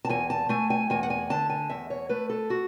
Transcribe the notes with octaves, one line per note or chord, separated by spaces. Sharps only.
A5
E2 G#5
A5
A3 G#5
G#5
E2 G#5
F#5
G#5
D3 A5
G#5
E2 E5
C#5
A3 B4
A4
F#4